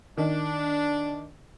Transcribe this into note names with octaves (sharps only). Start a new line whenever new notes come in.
D#3 D4